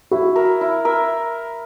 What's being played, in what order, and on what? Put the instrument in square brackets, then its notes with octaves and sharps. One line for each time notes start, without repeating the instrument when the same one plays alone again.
[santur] E4 [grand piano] F#4
[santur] A#4 E5
E4
A#4 E5